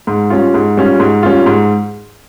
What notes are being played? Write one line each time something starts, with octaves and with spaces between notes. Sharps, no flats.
G#2
G3 C#4 F4
G#2
G3 C#4 F4
G#2
G3 C#4 F4
G#2